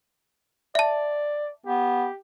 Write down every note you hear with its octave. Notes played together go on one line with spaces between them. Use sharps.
D5 E5 A5
B3 G4